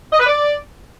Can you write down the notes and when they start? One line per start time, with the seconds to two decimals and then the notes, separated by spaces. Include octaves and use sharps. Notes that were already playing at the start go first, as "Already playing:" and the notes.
0.13 D#5
0.20 B4
0.26 D5